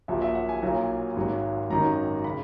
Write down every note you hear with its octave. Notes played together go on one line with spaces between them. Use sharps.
A#1 A#2 F#3 E5
E5
F#5
G#5
B1 A#2 F#3
G#1 G#2 F#3
G#1 F#2 D#3 F#3 A#5
C#3 B5